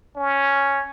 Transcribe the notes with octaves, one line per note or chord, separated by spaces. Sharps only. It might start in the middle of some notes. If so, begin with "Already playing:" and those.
C#4